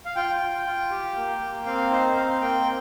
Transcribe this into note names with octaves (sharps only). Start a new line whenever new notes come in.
F5
F4 G5
F4
F4
G4
A#3
A#3
C4 F5
D#4 C5
C4 F5
A#3 G5